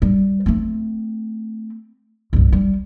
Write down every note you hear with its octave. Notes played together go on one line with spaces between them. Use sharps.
G3
A3 C4
C2 G2
G3